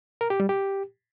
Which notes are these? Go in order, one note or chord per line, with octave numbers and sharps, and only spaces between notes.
A#4
G4
G3
G4